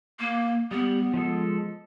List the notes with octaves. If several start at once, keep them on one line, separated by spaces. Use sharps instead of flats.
A#3
G3 B3
F3 G#3 A4